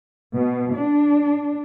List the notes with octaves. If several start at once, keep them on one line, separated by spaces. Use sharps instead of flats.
B2
D4